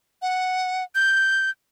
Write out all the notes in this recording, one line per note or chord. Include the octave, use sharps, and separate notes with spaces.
F#5
G6